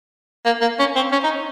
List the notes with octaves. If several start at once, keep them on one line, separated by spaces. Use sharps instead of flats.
A#3
A#3
C#4
C4
C#4
D#4